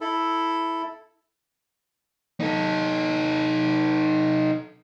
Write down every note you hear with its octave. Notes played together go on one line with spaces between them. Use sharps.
E4 A4
D#4 A4